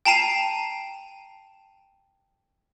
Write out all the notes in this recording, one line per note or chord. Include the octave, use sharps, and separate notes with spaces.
G5 A5 A#5 C7 D#7 E7